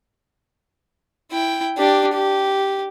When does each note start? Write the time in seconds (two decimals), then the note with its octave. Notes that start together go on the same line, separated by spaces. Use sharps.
1.31 E4 G5
1.78 D4 G4
2.13 G4